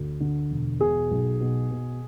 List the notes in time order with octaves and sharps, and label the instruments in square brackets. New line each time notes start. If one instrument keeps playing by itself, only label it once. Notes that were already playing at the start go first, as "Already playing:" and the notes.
Already playing: [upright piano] D2
D3
E1
B2 G#4
B1
B2
B2